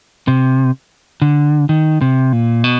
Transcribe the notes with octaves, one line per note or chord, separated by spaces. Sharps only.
C3
D3
D#3
C3
A#2
B2